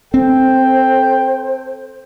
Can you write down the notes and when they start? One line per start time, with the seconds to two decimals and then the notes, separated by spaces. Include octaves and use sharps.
0.14 C4 A4 C5 G5